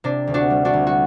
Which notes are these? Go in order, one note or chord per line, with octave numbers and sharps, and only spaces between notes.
C3 D4
D2
D4 F#4
G3
D4 F#4
D2
F#4